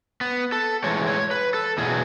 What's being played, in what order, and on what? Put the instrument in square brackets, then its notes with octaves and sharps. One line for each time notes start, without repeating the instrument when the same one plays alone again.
[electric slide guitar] B3
A4
A2 E3 G#3 C#5
C#5
B4
A4
E2 B2 F#3 G#4